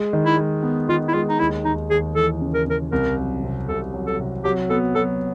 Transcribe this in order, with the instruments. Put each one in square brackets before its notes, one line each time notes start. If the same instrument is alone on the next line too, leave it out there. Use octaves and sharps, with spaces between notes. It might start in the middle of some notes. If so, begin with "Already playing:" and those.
Already playing: [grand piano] G#3
D#3
[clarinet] E4
[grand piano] G#3
B3
[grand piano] D#3 [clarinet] F4
[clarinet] E4
[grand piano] G#3 [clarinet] F4
[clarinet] D#4
[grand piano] D#2 [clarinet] E4
[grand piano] D#2 [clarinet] D#4
[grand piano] D#2 [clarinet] G#4
[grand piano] E3 [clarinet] A4
[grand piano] C#3
[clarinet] A#4
[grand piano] C#3 [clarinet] A#4
[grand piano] C2 [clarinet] A#4
[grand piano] F#3
C3
[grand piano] C2 [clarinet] A4
[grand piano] F#3
[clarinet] A4
[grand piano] C3
[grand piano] F#3 [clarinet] G4
[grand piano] B3 [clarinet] A4
[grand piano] F#3 [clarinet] A4